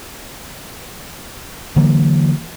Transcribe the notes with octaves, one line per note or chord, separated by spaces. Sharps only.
D3 E3 F#3 A#3